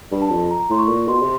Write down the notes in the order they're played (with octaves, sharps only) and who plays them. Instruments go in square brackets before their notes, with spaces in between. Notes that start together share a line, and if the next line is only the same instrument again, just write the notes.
[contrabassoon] G2
[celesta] A5
[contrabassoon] F2
[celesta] A#5
[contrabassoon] A2 [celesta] C6
[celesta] C#6
[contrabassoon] A#2
[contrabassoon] B2 [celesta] C6
[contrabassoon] C3